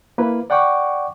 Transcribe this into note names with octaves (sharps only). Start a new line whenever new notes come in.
A#3 E4 B4
D5 F#5 G5 C#6 D6